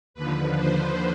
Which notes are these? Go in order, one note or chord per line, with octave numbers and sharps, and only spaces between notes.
D#2 D3 F3 B4
C5